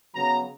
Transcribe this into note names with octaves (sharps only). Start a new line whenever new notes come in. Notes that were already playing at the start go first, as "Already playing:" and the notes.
C#3 F#3 B3 A#5